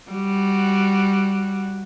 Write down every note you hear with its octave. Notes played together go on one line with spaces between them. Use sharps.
G3 F#4